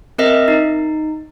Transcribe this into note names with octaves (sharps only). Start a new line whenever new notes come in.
C4 A#4 D#5 E5
D#4